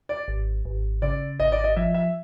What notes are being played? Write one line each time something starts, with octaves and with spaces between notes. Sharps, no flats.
D5
G#1
G#1
C#3 D5
G#1 D#5
D5
D#5
F3 E5
E5